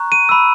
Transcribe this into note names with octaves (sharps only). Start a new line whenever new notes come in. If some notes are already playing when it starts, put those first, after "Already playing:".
Already playing: A#5 C#6 F#6
D#7
B5 E6